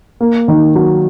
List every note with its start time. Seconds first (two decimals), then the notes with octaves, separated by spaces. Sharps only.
0.20 A#3
0.48 D#3
0.75 F#3